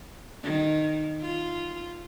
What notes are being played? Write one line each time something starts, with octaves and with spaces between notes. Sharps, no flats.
D#3
F4